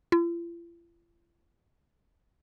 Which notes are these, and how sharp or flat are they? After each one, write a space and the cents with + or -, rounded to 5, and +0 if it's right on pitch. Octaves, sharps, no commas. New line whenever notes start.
F4 -45